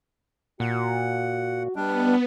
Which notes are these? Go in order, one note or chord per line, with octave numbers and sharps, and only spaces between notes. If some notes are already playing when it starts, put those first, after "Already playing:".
A#2 F#4 F#5
G3 B3 D4 G4 D#5